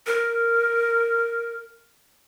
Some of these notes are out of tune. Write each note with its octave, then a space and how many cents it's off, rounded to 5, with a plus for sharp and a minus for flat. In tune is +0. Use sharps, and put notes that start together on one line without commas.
A#4 -5